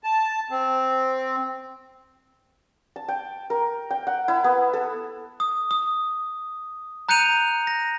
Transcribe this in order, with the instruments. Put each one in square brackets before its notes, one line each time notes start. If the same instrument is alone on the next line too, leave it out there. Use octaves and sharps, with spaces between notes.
[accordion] A5
C4
[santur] A5
G5
A#4
G5
F#5
E4
B3
A4
[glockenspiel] D#6
D#6
A#5 F#6 G6 C#7 D#7 F7
A#6